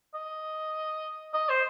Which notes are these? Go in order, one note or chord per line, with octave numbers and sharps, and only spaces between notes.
D#5
D#5
C5